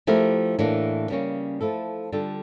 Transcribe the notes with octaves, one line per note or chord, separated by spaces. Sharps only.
F3 A3 E4 G4 A#4
A2 E3 A#3 D4
C#3 G3 A#3 C#4
F3 A3 E4 A4
D3 G3 D4 F4 A4